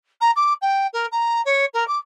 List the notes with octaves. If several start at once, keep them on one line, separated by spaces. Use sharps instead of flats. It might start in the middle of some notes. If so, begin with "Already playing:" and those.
A#5
D6
G5
A#4
A#5
C#5
A#4
D6